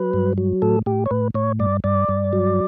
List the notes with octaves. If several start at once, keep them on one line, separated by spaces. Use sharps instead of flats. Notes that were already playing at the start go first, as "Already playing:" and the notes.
Already playing: F#3 B4
G2
F#3
A2 A4
A2 G4
C#5
A2 B4
A2 C#5
G2 D5
G2 D5
G2
F#3